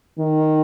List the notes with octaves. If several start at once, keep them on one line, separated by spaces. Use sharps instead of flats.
D#3